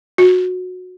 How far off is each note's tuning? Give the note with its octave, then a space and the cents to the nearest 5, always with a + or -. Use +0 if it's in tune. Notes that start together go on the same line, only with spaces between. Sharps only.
F#4 -20